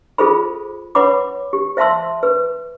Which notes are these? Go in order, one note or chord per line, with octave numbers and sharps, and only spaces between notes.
F4 G#4 A4 C5 B5
B4 C#5 F#5 B5 D6
G4
C5 E5 F5 A5 C6 E6
B4